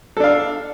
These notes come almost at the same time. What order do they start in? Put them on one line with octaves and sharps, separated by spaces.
A4 D4 F5